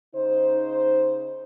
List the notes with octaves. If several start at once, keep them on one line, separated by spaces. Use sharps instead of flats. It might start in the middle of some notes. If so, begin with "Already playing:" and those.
C#3 D#4 C5